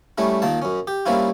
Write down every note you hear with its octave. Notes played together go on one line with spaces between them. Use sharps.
G3 A3 C#4 E4
A#2 D#3 A#3 A5
F#2 C#4
G4
G3 A#3 C4 C#4 E4 F4